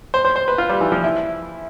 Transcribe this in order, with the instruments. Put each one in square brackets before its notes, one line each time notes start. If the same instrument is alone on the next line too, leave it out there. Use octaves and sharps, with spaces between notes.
[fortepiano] C5
C5
C5
B4
F4
G3
E3
F3
E4